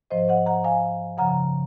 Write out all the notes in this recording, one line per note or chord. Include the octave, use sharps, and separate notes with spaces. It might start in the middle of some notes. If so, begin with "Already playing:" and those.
G#2 F3 C5 D#5
D#5 F#5
F#5 A#5
F5 G#5
F#2 C#3 F3 F#5 A#5